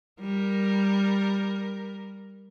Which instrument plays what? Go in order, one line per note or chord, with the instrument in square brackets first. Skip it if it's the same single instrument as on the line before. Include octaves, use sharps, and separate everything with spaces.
[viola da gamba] G3 A#4